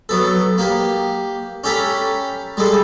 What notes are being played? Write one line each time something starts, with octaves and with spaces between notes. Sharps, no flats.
F#3 B3 A4
A#3 G4
C#4 G4 A4 A#5 B5
G3 G#3 G#4 A4